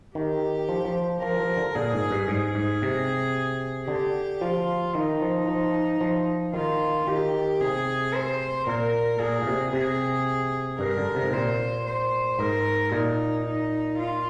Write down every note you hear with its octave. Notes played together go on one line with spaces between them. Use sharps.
D#3 G4
F3
F3
F3 A#4
F3
D3
A#2 G#4
G#2
G2
G#2 G#4
G#2
C3
D3 G4
F3 F4
D#3 D#4
F3
F3
F3
D#3 F4
D#3 G4
C3 G#4
C5
A#2 A#4
A#2 G#4
A#2
C3
C3 G#4
G2 A#4
D3
C3
G#2
A#2 C5
C5
G#2 A#4
A#2 D#4
D#4
F4